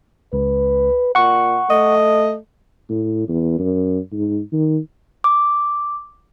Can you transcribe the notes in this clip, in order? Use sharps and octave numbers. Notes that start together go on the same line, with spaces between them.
C#2 B4
A#2 F#5 C#6
A3 D#5
A2
E2
F#2
G#2
D#3
D6